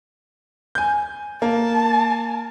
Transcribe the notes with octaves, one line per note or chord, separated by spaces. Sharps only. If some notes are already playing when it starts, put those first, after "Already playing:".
G#5 G6
A#3 A5